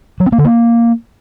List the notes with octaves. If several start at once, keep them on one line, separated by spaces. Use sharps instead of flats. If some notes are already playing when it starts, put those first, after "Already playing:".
F#3
C4
A#3
D3
A#3